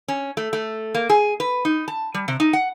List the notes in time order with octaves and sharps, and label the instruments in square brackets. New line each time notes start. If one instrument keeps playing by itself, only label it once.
[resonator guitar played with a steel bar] C#4
A3
A3
A#3
G#4
B4
D#4
A5
G3
C3
D#4
F#5